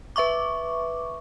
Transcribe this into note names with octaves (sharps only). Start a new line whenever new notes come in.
B4 E5 C#6 D6